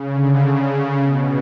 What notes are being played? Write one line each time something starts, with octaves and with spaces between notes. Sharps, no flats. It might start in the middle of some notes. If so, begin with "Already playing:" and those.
Already playing: C#3
D3
C#3
B2